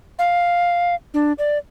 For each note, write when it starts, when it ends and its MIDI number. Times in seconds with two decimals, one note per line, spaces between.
0.19 0.95 77
1.14 1.33 62
1.39 1.58 74